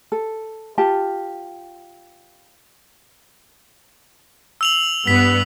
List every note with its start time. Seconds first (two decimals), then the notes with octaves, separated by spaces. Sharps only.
0.12 A4
0.78 F4 G4 A5
4.61 E6 F7 F#7
5.07 G2 B3 B6